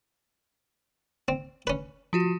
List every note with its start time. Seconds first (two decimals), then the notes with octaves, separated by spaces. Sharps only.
1.28 C4
1.67 C#4 B4
2.13 F3 F4 F#4